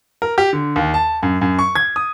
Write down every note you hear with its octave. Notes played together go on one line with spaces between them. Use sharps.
A#4
G4
D3
D#2
A5
F#2
F#2
C#6
G#6
D#6